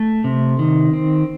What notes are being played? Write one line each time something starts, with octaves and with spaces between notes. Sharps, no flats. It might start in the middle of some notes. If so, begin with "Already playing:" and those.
Already playing: A3
C3
D#3
C4